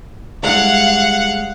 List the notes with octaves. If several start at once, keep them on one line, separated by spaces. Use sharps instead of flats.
G3 G#3 E4 F5 F#5